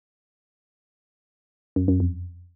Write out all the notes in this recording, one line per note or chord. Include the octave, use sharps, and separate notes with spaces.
F#2
F#2
F2